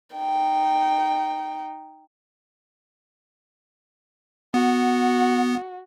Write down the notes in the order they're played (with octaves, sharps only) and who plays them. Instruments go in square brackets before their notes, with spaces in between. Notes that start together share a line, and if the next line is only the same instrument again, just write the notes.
[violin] D#4 G5
[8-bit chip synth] B3 [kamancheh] F#4